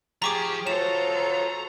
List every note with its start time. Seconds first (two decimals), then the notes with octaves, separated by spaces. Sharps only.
0.22 F3 G4 G#4 A#5 C#6 D6
0.67 F4 F#4 A4 C5 C#5 A#5 E7